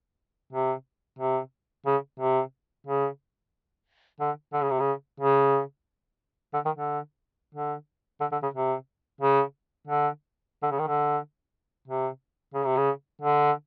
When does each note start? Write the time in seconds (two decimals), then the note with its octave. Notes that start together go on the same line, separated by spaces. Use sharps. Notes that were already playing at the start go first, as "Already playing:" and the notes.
0.53 C3
1.19 C3
1.86 C#3
2.20 C3
2.87 C#3
4.20 D3
4.53 D3
4.62 C#3
4.71 C3
4.80 C#3
5.20 C#3
6.54 D3
6.65 D#3
6.75 D3
7.54 D3
8.21 D3
8.32 D3
8.43 C#3
8.54 C3
9.21 C#3
9.87 D3
10.62 D3
10.71 C#3
10.79 D#3
10.87 D3
11.88 C3
12.54 C#3
12.65 C3
12.77 C#3
13.21 D3